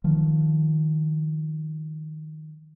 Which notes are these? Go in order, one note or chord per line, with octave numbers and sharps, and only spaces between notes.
D#3 F3